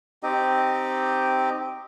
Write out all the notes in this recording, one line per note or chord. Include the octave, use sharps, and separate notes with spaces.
C4 D#4 G4 D#5